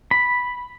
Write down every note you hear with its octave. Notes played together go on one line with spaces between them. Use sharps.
B5